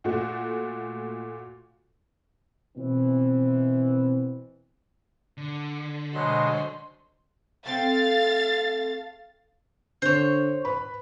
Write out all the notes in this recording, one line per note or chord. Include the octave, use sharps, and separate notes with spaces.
A#2 A3 F#4
B2 E3 C4
D3
B2 F#3 G#3 C5 D#5 C6
A3 C4 A4 F5 A6
D3 C5 C#5
B4 B5